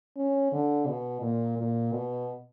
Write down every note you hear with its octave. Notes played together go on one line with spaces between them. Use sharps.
C#4
D3
B2
A#2
A#2
B2